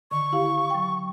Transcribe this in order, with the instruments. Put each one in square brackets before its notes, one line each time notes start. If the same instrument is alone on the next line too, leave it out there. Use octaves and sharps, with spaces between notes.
[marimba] D3 D#3 [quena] C#6
[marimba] E4 G4 F5
F#3 G5